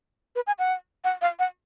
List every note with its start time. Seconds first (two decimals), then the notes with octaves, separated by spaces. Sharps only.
0.36 B4
0.47 G#5
0.59 F#5
1.04 F#5
1.22 F5
1.39 F#5